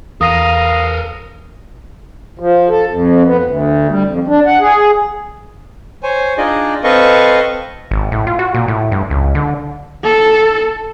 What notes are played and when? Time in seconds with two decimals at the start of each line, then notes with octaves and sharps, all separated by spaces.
0.21 E2 A4 A#4 F5 D#6 A#6 D#7
2.39 F3
2.69 A4
2.89 F2
3.25 B3
3.44 D2
3.89 G3
4.06 F2
4.28 D4
4.45 F#5
4.60 G#4
6.03 C5 C#5 G#5
6.38 D4 D#4 F4 G#4 D5 D#5
6.84 C4 A4 B4 D#5 F5 C#6
7.91 G#1
8.12 A2
8.27 F4
8.39 F#4
8.54 A#2
8.68 A2
8.92 G2
9.10 C#2
9.35 D3
10.03 A4